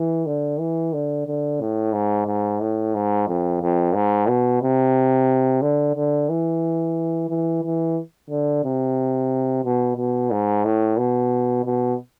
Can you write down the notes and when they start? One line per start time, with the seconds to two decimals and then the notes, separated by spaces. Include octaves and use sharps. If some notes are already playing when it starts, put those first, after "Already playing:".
Already playing: E3
0.26 D3
0.59 E3
0.93 D3
1.27 D3
1.61 A2
1.93 G#2
2.27 G#2
2.61 A2
2.95 G#2
3.28 F2
3.62 F2
3.95 G#2
4.28 B2
4.62 C3
5.62 D3
5.96 D3
6.29 E3
7.29 E3
7.63 E3
8.30 D3
8.64 C3
9.65 B2
9.97 B2
10.31 G#2
10.65 A2
10.98 B2
11.65 B2